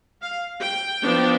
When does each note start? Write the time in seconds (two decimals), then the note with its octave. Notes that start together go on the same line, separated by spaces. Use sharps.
0.22 F5
0.61 G5
1.02 F3 B3 D4